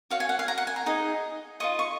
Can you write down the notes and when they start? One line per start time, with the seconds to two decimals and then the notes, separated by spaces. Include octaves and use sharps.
0.10 F#4 C#5 F5
0.20 G#5
0.29 F#5
0.39 F5
0.48 A#5
0.58 F#5
0.67 G#5
0.76 A#5
0.86 D#4 G#4 D#5
1.60 F4 A#4 D#5 C#6
1.79 C#6